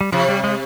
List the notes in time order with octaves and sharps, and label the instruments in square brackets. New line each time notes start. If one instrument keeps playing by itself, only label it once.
[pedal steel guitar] G3
[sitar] C3 [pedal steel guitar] F3
[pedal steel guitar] G3
G#3